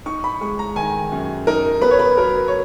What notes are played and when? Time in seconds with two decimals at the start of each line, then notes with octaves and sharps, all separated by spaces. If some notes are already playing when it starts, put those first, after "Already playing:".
0.06 D#4 C#6
0.24 B5
0.41 G#3 C#6
0.59 A#5
0.76 D#3 G#5
1.12 F#2
1.47 D#4 A#4
1.82 B3 B4
1.91 C#5
1.99 B4
2.17 F#3 A#4
2.48 C#5